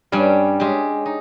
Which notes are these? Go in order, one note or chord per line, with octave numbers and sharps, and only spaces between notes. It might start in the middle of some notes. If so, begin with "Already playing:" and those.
G2 G3 C#4
G#3 C#4 G4
D#4